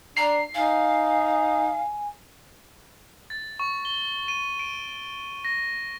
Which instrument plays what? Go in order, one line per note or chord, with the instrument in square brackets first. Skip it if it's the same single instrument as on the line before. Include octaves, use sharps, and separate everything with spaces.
[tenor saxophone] D4 [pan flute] A#5 [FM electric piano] C7
[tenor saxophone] D#4 [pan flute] F5 [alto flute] G#5
[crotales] A6
C#6
G7
D#7
D7
A#6